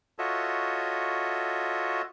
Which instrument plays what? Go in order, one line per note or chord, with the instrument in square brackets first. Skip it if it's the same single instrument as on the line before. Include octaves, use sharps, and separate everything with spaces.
[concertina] F4 F#4 A4 C#5 D#5 E5